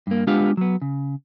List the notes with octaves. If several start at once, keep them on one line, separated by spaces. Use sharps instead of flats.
G2 A#3
G#3 B3 D4 F4 G4 F5
F#3 B3
C#3